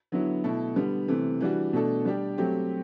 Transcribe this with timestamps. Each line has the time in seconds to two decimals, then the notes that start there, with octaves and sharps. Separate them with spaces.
0.12 D3 F#3 B3 E4
0.44 B2 A3 E4 A4
0.76 D3 G3 B3
1.08 C3 E3 A3
1.41 E3 G3 D4 F#4
1.73 B2 A3 D4 A4
2.05 G3 D4 G4
2.38 F#3 A3 C4 G4